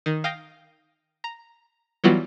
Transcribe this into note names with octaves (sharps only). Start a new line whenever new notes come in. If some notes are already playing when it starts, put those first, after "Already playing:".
D#3
F5 G5 D#6 G6 A#6
A#5
E3 F#3 G3 B3 F4 F#4